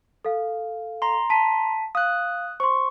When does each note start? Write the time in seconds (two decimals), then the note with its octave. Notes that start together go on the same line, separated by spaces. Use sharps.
0.25 A4 F5
1.02 A#5 C6
1.30 A5 B6 D#7
1.95 F5 D#6 F#6
2.60 C5 C6 C#6